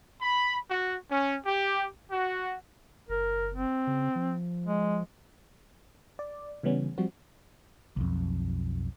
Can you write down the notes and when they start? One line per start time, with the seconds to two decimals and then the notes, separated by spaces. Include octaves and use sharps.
0.22 B5
0.71 F#4
1.11 C#4
1.46 G4
2.10 F#4
3.09 F#1 A#4
3.55 C4
3.87 C#3
4.15 F3
4.66 G#3
6.19 D5
6.63 C#3 E3 G3 B3 C#4
6.98 F3 G3 C4 F#4
7.97 B1 F2